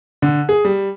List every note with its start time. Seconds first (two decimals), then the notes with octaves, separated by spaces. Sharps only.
0.22 D3
0.49 G#4
0.65 G3